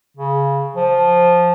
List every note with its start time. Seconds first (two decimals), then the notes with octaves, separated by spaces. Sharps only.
0.17 C#3
0.76 F3